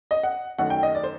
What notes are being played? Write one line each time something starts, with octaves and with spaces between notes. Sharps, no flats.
D#5
F#5
F#2 D#3 A3 F#5
G5
D#5
D5
C5